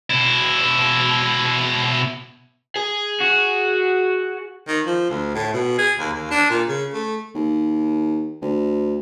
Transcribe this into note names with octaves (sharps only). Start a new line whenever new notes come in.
B2 E4
G#4 G#5
F#4
D#3
F3
D2
A2
B2
G#4
D#2
D#2
D4
A#2
C#3
A3
D#2
D2